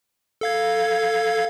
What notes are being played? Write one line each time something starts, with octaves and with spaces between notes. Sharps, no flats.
A4 F5 G#6